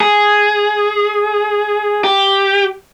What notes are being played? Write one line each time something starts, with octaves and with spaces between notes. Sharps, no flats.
G#4
G4